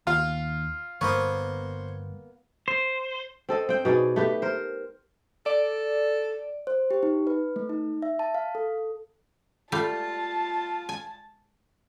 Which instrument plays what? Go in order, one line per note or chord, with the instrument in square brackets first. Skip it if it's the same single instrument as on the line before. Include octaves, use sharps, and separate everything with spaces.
[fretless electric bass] D#2 [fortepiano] F4 F5
[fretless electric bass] G1 [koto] A#3 B3 [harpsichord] C5 C#5
[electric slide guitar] C5
[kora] C4 A4 D#5
C4 G5
B2 D#4 G#4 D5
A3 G4 B4
A#4 C5
[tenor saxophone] A4 [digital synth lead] D5
[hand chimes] C5
G4
D#4
B4
A3
D#4
E5
A5
F5
A4
[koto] G3 A3 F5 [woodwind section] F4 [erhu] A5
[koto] G#5